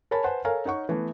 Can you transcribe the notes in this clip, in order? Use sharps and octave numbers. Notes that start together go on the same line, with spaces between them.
A#4 C#5 G#5 A5 B5
B4 C5 F#5 G#5 A5
A4 A#4 C#5 F5 G#5 A#5
D#4 C#5 F#5 C#6
E3 A3 B3